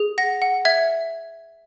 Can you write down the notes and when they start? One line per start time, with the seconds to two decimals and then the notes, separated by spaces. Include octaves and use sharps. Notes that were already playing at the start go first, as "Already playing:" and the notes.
Already playing: G#4
0.18 F#5 A#6
0.42 F#5
0.65 E5 G#6